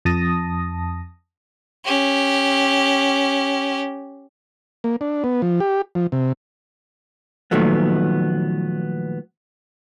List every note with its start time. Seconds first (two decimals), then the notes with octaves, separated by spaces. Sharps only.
0.05 F2 A5 D#6 A#6
1.85 C#4 G4
4.84 A#3
5.01 D4
5.24 B3
5.42 F3
5.60 G4
5.95 F3
6.12 C3
7.51 A#2 D#3 F3 F#3 A3 B3